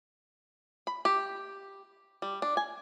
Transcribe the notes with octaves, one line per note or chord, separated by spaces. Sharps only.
B5
G4
G3
D4
G#5